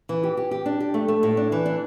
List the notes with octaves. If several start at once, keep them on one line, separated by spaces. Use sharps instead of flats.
E3
G4
G4
G4
D4
G4
A3
A3
A2
D4
E3
D4